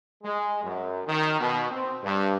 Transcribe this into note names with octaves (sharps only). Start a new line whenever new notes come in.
G#3
F#2
D#3
B2
C4
G2